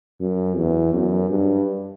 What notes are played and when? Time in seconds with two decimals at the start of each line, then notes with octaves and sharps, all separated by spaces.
0.21 F#2
0.56 E2
0.94 F#2
1.30 G2